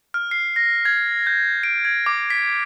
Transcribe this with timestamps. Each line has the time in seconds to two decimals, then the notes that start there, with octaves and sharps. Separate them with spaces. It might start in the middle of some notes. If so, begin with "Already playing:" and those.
0.14 F6
0.31 C7
0.56 A#6
0.85 G#6
1.27 G6
1.63 D7
1.85 G#6
2.06 D6
2.30 B6